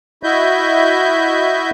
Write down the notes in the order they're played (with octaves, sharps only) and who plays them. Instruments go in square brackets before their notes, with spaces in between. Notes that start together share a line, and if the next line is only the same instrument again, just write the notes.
[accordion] E4 F#4 D#5 E5 G6